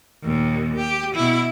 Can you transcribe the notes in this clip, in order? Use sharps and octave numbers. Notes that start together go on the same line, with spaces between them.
D#2 A#2
G4
B2 E4